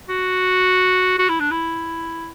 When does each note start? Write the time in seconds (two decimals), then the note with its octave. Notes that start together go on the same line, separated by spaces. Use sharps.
0.09 F#4
1.19 F#4
1.29 E4
1.40 D4
1.51 E4